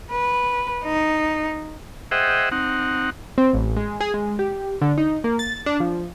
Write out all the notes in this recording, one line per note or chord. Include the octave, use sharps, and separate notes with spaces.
B4
D#4
G#4 C5 D#5 E5 F#5 G5
C4 D#4 F#5
C4
A1
G#3
G#4
G#3
G4
D3
D#4
A#3
A6
D4
F3